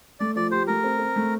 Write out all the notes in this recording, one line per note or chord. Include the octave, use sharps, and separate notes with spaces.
A3 D5
F3 D5
G4 C5
A3 A#4
C4
C4
A3